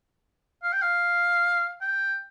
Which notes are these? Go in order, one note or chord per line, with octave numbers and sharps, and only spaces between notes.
F5
G5
F5
G5